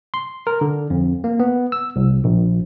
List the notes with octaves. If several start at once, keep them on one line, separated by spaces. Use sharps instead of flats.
C6
A#4
D3
F2
A#3
B3
E6
C2
A#1